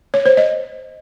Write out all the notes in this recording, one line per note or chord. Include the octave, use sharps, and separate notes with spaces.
C#5
C5
D#5